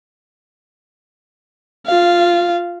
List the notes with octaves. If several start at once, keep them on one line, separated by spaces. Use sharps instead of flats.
F4 F5